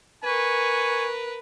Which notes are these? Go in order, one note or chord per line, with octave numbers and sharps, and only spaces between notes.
A#4 B4 G#5 C#6